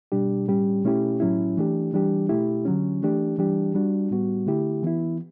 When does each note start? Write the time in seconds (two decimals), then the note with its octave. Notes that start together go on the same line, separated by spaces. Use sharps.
0.12 B2 G3 D4 G4
0.48 A2 G3 C#4 G4
0.84 B2 A3 C#4 E4 G4
1.20 A2 F#3 C#4 E4
1.57 E3 A3 D4 G4
1.93 E3 G3 D4 G4
2.29 B2 A3 E4 G4
2.65 D3 F#3 C#4
3.02 E3 A3 D4 G4
3.38 E3 G3 D4 G4
3.74 G3 D4 F#4
4.11 A2 G3 B3 F#4
4.47 D3 A3 E4 G4
4.83 E3 B3 E4